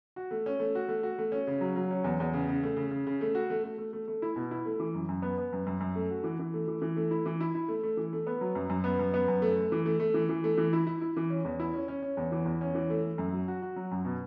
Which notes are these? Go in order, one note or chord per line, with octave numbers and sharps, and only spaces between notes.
F#4
A3
C#4
A3
F#4
A3
F#4
A3
C#4
C#3
F#3
F#3
C#4
E2
E2
C#3
C#3
A3
C#3
C#3
C#3
A3
F#4
A3
A3
A3
A3
A3
E4
B2
E4
A3
E3
F#2
F#2
B3
B3
F#2
F#2
F#2
A3
F#4
E3
E3
A3
E3
E3
A3
E4
E3
E4
E4
A3
A3
E3
A3
B3
F#3
F#2
F#2
B3
F#2
B3
F#2
A3
A3
E3
A3
A3
E3
E3
A3
E3
E4
E4
E4
E3
C#4
E2
E4
C#4
C#4
C#4
E2
E3
E2
C#4
E3
A3
A3
F#2
F#3
F#4
F#4
F#3
F#2
B2